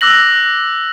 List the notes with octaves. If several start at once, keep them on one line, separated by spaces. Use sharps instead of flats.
D6 E6 F#6 A#6 F#7